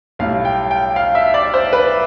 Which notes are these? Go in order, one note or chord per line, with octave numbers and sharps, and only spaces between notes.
B1 A2 G3 F5
G5
G5
F5
E5
D5
C5
B4